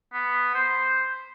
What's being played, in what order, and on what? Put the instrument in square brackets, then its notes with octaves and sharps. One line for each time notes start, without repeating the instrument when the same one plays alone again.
[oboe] B3
C5